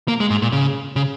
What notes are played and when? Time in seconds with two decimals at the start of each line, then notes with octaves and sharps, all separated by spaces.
0.08 A#3
0.20 G#3
0.30 G#2
0.42 A#2
0.52 C#3
0.96 C#3